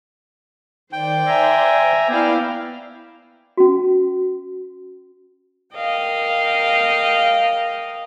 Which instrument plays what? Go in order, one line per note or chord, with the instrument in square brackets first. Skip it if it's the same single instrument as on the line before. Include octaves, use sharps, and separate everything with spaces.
[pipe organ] D#3 [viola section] C5 D5 [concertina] G5
[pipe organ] E5 G#5 A#5
[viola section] B3 E4 F5 [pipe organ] D5 G5
[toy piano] C#4 F#4
[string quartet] A#4 D#5 F5 G5